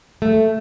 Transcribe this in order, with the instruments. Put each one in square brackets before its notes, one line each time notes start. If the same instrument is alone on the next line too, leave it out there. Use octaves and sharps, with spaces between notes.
[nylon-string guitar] A3